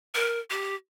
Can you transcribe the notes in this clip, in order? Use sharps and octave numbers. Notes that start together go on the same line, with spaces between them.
A#4
G4